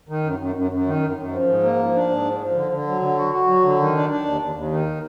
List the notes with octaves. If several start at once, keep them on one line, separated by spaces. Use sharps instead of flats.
D#3
F#2
F#2
F#2
F#2
D#3
F#2
F#2
F3
G#2
A#3
F3
D4
G#2
F3
F3
D3
D3
F#3
D3
F#4
F#4
F#3
D3
D#3
D4
D4
D#2
D#2
D#2
D#3